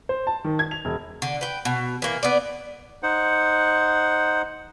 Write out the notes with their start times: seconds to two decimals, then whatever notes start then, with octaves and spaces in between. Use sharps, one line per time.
0.09 C5
0.27 A5
0.44 D#3
0.59 G#6
0.71 F7
0.85 E1
1.22 D3
1.41 B4 G5
1.65 B2
2.02 E3 A#3
2.23 B3 D5
3.03 D#4 C5 F#5